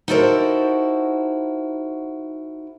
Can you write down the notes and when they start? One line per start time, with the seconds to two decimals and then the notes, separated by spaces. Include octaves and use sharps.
0.08 D#4 E4 F#4 A4 A#4 C5